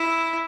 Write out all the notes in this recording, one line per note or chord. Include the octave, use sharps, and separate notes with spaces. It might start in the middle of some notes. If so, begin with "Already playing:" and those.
Already playing: E4